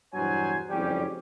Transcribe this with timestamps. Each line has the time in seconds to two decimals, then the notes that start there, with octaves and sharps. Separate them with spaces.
0.14 E2 G2 B2 F#3 C5 G#5
0.70 F#1 F2 G#2 G3 C#4 G4